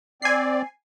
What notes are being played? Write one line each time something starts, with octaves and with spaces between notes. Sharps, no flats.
C4 D5 G#5 C7